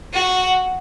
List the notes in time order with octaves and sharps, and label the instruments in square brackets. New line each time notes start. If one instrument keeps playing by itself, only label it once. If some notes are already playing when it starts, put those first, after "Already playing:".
[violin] F#4